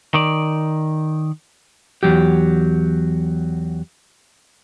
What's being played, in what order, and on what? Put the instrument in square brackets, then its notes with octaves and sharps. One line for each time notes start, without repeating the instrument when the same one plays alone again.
[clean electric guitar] D#3 D5
[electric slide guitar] E2 E3 F#3 G4